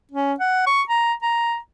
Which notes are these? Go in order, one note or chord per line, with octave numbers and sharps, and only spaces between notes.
C#4
F#5
C#6
A#5
A#5